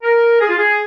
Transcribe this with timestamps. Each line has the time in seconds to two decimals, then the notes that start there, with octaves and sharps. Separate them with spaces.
0.03 A#4
0.41 G#4
0.49 F4
0.57 G#4